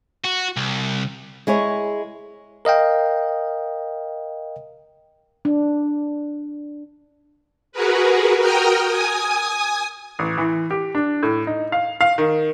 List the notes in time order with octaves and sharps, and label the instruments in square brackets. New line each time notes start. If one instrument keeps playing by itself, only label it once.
[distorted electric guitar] F#4
C2
[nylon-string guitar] G#3 E4 G#4 C#5
[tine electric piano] A#4 D#5 F5 G5
[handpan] D4
[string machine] F#4 G#4 A#4 B4
F#4 A#4 G5 A#5 D#6 F6
G#5 D#6
[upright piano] A1
E3
G4
D4
A2
D#4
F5
F5
D#3